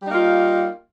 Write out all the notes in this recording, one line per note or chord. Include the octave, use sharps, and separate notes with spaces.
G3 A#3 D#4 F4